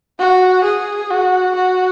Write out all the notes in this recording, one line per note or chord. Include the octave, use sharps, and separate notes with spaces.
F#4
G#4
F#4
F#4